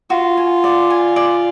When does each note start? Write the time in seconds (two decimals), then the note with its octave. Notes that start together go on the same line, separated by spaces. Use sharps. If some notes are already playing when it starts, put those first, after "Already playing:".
0.10 F4 F#4
0.37 G#5
0.64 D5
0.90 G#5
1.16 D5